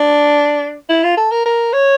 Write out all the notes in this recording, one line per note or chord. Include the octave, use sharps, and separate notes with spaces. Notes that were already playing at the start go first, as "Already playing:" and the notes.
Already playing: D4
E4
F4
A4
A#4
A#4
C#5